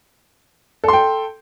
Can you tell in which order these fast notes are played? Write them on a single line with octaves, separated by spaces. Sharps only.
A4 C6 G5